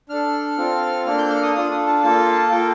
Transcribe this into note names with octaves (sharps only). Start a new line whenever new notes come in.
D4 A4 F6
C4 F4 A4
A#3 D4 A4 F6
G6
F6
D#6
D4 F4 A4 D#6
A5
A#3 F4 A4
A#3 F4 A4 G5